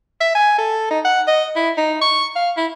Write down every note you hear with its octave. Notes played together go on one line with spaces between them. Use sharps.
E5
G#5
A4
D#4
F#5
D#5
E4
D#4
C#6
F5
E4